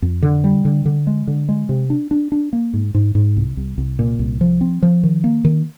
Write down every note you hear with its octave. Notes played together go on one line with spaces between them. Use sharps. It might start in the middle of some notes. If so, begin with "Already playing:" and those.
F2
D3
G3
D3
D3
G#3
D3
G#3
C3
D4
D4
D4
A#3
G#2
G#2
G#2
C2
C2
C2
A#2
C2
F3
C4
F3
D#3
A#3
D#3